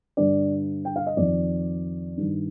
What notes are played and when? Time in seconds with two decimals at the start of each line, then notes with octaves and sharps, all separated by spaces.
0.17 G2 D3 D5
0.85 G5
0.96 F5
1.07 D#5
1.17 F2 D#3 D5
2.17 G2 D#3